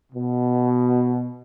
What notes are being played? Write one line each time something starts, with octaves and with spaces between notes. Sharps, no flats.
B2